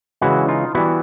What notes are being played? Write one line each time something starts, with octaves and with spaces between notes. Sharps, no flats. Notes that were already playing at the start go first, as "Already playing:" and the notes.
C#3 E3 G#3 E4 F#4
D#4 F4
E3 G3 B3 E4 F#4